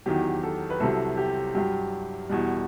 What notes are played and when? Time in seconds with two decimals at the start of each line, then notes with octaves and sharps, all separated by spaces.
0.06 E2 D#3 F#3 G4
0.43 A4
0.70 B4
0.80 C2 C3 F#3 A4
1.17 G4
1.55 G2 F#3 G4
2.29 E2 B2 G3